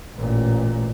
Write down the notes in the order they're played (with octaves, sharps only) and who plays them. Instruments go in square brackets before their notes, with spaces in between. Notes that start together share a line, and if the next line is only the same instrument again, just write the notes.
[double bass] A1 A#2